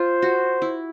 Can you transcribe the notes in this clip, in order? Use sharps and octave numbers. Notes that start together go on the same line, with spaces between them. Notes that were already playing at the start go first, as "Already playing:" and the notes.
Already playing: F4 C5
F#4
E4